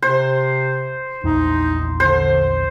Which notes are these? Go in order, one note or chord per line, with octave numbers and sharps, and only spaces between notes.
C3 C5
A#1 E2 D#4
D3 C5